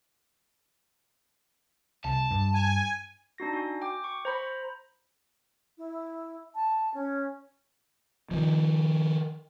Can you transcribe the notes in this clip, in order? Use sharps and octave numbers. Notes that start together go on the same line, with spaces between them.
C2 A5
G2
G#5
D4 D#4 F#4 A#6
F#4 G#5
G5 D6
C#6
C5 A#5 B5
E4
A5
C#4
D#3 F3